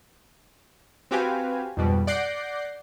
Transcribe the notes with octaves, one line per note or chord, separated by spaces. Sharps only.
C4 F#4 G4 B4 F5 G#5
F2 G#2 B2 G3
D5 F#5 D6 G6 A#6 C7